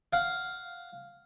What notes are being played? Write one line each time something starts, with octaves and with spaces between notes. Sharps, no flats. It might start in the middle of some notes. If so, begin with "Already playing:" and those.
F5 F#5